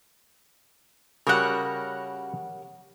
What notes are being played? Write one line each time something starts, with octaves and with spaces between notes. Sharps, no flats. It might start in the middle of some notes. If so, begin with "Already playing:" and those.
C#3 G3 F#4 G4 A#4 C#5 F#5